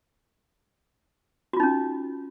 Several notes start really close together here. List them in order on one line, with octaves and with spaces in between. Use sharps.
F#4 F4 D#4 C#4